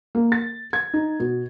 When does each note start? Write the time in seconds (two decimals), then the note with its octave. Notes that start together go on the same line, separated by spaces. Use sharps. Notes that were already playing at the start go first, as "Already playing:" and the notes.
0.15 A#3
0.32 A6
0.73 G#6
0.94 D#4
1.20 B2